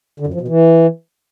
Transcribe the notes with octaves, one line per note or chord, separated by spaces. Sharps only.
D3
F#2
F3
B2
E3